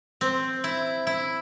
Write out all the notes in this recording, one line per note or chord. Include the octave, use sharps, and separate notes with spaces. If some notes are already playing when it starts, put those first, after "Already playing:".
C4
E4
E4